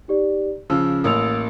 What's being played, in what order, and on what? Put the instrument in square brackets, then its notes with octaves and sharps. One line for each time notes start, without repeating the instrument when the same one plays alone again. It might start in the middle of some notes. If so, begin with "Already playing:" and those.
[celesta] D#4 G4 D5
[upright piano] C#3 F3 [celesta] E6
[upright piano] A1 A#3 [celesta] D#6 E6 F7